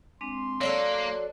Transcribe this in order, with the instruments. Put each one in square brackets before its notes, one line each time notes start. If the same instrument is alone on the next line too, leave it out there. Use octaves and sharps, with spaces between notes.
[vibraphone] G#3 C4 D4 [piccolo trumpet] C6
[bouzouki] F#3 D4 A4 [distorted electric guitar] A#3 [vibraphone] C#5